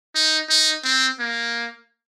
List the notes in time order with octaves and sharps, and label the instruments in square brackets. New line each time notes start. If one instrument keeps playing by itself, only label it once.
[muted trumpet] D#4
D#4
C4
A#3